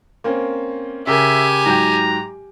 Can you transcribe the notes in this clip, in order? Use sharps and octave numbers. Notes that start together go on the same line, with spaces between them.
A#3 C4 C#4
C#3 G4 A#4 E5 G#5
G#2 F#3 G5 A#5